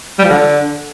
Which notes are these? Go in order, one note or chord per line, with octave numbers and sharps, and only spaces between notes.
G3
F3
D3